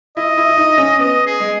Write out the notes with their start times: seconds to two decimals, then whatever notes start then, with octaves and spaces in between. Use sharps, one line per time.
0.17 E4 D#5
0.37 E4
0.48 E4
0.57 D#4
0.78 C#4
0.99 B3 D#5
1.26 G#4
1.40 G#3